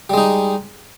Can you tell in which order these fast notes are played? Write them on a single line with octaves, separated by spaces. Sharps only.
G3 G#3 D#4